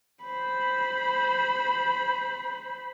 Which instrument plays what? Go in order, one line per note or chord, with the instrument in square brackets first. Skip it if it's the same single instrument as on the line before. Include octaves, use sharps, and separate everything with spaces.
[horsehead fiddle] C5 B5